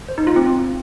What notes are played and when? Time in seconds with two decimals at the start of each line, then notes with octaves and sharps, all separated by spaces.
0.09 C5
0.18 D#4
0.27 F4
0.36 C4